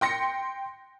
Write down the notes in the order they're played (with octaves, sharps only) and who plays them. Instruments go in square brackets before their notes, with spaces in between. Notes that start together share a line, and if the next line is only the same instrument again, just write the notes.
[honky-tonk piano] G5 C6 A#6 C#7